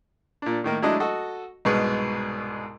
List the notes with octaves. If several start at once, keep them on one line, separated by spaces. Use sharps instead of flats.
A#2 D4
A2 D#3 A#3
F#3 G#3 A3 D4 E4 D#5
F#4 A4 D#5
C2 G#2 B2 G#3 B4 C#6